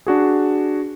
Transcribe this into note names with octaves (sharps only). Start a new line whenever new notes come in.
D4 F#4 G#4